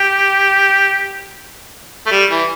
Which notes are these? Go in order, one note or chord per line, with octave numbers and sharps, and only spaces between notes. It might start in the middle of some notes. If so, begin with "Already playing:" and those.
Already playing: G4
A3
G3
E3